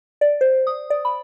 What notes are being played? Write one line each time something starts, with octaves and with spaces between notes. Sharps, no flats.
D5
C5
D#6
D5
B5